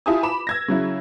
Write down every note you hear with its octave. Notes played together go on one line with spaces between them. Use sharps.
E4 F4 G4 G#5 A5 D#6
B5 D6 E7
E6 G#6 A#6
C#3 F#3 E4